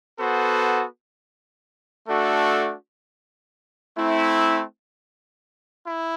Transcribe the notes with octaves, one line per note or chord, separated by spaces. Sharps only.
B3 F#4 A4 C5
A3 D4 F#4 A4
A3 C4 E4
E4